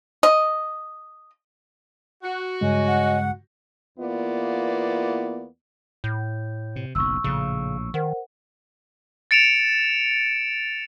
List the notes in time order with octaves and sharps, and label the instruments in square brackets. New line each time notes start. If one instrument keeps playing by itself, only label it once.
[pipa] D#5
[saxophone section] F#4
[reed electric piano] G2 C#3 G#3 [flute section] C#5 D#5 G#5
[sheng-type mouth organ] F#5
[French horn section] E2 A#3 B3 E4 F4 D5
[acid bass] A2 [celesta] G6
[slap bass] C3
[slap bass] F#1 B1 [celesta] C#6 E6
[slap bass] A#1 A2 [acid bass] C#3
[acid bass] D#3 [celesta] A#4 C5 F#5
[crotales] A6 C#7 D7 E7 F7